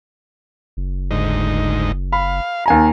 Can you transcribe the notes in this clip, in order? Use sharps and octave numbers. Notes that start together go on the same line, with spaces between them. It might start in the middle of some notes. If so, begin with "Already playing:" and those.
F#1
D2 G#2 D#4
F5 B5
D#2 G#5 A#5